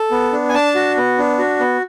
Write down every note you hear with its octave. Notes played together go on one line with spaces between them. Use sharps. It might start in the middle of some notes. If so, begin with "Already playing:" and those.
Already playing: A4
B3
D4
G#5
D4 A5
F#4
B3
D4
F#4
B3